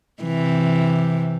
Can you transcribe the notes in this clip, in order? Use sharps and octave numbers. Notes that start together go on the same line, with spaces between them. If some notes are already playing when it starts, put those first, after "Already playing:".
C3 E3